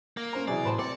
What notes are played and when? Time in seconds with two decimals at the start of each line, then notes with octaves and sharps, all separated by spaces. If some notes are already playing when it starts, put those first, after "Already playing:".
0.17 A#3
0.33 C#4 C5 A#5
0.48 C3 E3 F#3 G#4 D5
0.65 A2 B4 C5 A5
0.79 C4 D5 C#7